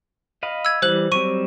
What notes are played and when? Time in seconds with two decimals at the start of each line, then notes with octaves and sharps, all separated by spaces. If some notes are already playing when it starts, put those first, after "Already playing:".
0.43 D#5 F5 B5
0.65 E6 G#6
0.82 E3 G3 C5 F#6 F#7
1.12 F#3 G3 C4 C#6 D#7